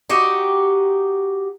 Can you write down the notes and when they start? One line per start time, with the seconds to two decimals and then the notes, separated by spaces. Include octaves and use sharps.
0.09 D#4 F#4 G4